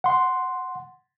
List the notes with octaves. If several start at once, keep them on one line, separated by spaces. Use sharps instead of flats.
F#5 C6